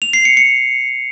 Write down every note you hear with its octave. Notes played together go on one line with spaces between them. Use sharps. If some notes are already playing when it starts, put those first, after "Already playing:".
F7
C7
C#7
C#7